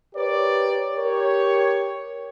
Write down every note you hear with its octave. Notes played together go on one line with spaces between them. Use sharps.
G4 A#4 B4 C#5 D5
G4 A#4 C#5